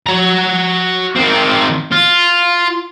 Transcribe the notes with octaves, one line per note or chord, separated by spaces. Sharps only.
F#4 A#5
D#3 C4
F4